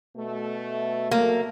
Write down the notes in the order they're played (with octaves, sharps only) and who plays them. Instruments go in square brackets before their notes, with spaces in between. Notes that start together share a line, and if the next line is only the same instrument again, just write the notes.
[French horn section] B2 A3
[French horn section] F#3 A3 [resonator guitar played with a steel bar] A#3